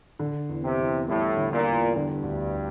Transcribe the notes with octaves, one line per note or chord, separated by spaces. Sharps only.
D3
E2
C3
E2
A2 G3
D3
A#2
E2
G2 D3
D2